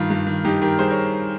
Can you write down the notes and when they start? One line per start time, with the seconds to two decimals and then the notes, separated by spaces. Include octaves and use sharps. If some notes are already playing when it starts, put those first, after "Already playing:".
Already playing: G2 D#3 F4
0.10 G2
0.26 D#3
0.44 G2 D#4 G4
0.61 D#3 G4 A#4
0.79 G2 G#4 C5
0.90 A#4 C#5